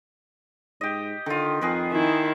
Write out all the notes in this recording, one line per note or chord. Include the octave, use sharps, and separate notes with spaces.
G#2 G4 D#5
D3 D#3 F4
F2 G#4 A#4 B4
D#3 E4